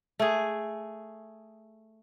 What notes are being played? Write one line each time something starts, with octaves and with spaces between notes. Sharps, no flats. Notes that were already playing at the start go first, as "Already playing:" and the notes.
A3 G#4